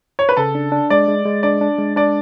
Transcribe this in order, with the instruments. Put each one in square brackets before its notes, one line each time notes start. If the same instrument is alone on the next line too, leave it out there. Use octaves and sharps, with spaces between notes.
[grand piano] C#5
B4
[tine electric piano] C#3 [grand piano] A4
[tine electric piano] D4
D4
[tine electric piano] G#3 [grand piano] D5
[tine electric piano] G#3
G#3
[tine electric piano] D4 [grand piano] D5
[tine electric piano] D4
G#3
[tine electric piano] D4 [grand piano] D5